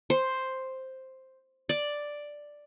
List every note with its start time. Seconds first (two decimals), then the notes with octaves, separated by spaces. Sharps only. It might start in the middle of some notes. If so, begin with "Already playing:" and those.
0.10 C5
1.69 D5